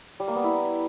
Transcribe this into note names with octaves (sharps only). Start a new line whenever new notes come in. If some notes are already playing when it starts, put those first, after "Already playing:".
G3
A#3
B3
E4